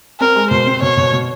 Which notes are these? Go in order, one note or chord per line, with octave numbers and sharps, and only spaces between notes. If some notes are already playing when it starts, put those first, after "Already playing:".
C4 A#4
G#3
B2 C5
C4
B2 C#5
B2
B2